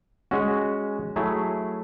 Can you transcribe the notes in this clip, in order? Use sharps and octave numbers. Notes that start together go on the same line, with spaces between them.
G#3 C#4 F#4
F#3 A3 E4 G#4